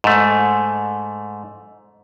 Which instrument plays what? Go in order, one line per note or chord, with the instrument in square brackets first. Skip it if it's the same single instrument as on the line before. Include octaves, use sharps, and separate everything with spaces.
[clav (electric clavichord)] G#2 A3